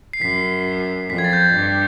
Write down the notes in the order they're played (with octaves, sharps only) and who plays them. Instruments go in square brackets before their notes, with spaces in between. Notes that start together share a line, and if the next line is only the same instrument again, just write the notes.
[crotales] C7
[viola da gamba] F#2 [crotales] B6
[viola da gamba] F2 [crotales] B6
[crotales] G#6
A6
G6
G#6
[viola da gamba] G2